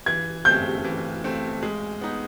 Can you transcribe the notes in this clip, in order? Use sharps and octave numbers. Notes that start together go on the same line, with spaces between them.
E3 G#6
A3 C4 G6
E3
A3 C4
G#3
B3 D#4